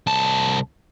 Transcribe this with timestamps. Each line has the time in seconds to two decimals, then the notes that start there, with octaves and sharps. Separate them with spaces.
0.07 C2 A5